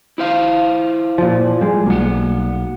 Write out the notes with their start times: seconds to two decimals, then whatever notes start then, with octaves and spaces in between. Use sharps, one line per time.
0.18 E4 C5 F5
1.18 A#2 F3
1.61 G3 G#3
1.86 B1 A#3 F#5